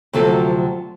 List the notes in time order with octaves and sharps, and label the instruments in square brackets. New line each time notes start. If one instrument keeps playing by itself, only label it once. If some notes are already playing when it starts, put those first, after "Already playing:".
[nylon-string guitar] D2 C3 F3 F#3 C4 A4